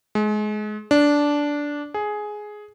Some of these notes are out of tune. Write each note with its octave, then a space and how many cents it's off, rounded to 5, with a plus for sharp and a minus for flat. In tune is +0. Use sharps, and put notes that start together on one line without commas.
G#3 +30
D4 -10
G#4 +10